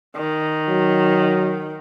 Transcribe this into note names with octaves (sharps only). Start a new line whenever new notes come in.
D#3
F#3